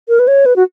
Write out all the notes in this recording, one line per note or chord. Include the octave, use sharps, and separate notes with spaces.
A#4
B4
C#5
B4
F#4